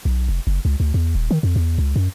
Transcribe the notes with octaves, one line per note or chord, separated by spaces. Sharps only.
B1
F1
F#1
C#2
D2
E2
D#1
D#3
F2
E2
C#2
F#2